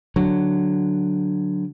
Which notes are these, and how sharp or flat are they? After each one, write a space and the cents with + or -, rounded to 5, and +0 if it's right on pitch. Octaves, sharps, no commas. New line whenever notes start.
D3 +0 F#3 +0